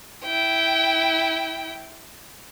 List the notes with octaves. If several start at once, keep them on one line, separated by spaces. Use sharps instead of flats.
E4 G5